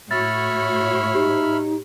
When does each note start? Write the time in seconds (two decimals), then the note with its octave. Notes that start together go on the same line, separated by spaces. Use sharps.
0.11 A2 F#4 C#5 E5 B5 F6 A6
1.15 D#4 G4